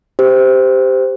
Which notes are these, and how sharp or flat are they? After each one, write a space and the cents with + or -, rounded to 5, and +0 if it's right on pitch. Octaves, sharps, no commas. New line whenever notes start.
G4 +0 C5 -15